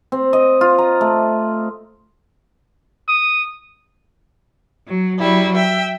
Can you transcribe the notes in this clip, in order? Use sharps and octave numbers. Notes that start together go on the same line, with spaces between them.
C4
D#5
F4
A#5
A3
D#6
F#3
F#3 G3 E4
E5 G5